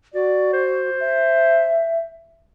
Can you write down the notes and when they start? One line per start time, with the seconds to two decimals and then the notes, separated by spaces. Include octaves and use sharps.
0.14 F#4 D5
0.53 C5
1.00 E5